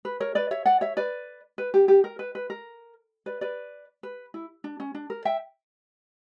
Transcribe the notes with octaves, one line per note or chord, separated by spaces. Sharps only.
B4
A#4 C#5
B4 D5
C#5 E5
D5 F#5
C#5 E5
B4 D5
B4
G4
G4
A#4
B4
B4
A#4
B4 D5
B4 D5
B4
E4
D4
C#4
D4
A#4
E5 G5